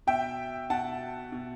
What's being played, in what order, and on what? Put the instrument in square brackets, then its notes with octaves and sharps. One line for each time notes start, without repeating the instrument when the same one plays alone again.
[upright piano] B2 E5 G5
B2 F#5 A5
B2